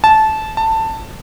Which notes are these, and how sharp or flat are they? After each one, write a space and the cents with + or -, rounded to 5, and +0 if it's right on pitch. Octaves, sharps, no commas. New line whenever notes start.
A5 -15
A5 +15